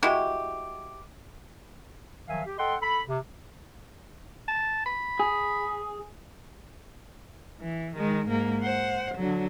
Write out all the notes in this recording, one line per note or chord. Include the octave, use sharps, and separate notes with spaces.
G#3 E4 F#4 G4
D#3 F3 F#3 E5 F5 G#5
G4
A4 D#5 F#5 G5 C6
A4 B5
C3
A5
B5
G#4
E3
D#3 G#3
G#2 A#3
C5 F#5
D3 F#3